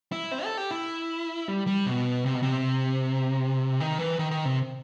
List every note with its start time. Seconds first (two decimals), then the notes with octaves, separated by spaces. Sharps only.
0.12 E4
0.31 C4
0.44 A4
0.58 G4
0.71 E4
1.48 G3
1.67 G3
1.86 B2
2.26 C3
2.35 B2
2.43 C3
3.80 D#3
3.99 E3
4.19 D#3
4.31 D#3
4.45 C3